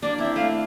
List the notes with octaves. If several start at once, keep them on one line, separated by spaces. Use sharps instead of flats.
A#3 D4 D5
C4 E4 E5
A3 F5